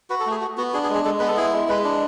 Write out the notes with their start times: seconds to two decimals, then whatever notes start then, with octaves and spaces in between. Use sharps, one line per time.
0.10 F#4 B4
0.20 A4
0.26 A3
0.31 G#4
0.41 F#4
0.57 B3 F#4
0.73 D4 G#4
0.84 G#4
0.89 G#3
0.95 G#4
1.05 G#3 A4
1.19 B3 B4
1.28 A4
1.37 E4 G#4
1.53 G#3
1.68 G#3 B4
1.84 D4